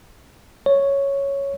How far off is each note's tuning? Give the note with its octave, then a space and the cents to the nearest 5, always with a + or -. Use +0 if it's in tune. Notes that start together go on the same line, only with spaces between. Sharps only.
C#5 +0